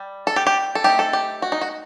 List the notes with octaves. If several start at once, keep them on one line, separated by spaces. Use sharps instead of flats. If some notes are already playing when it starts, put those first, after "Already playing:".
Already playing: G3
A4
G4
G4
A4
A3 C4 D#4 G4
A4
G4
F#4
D#4
F#4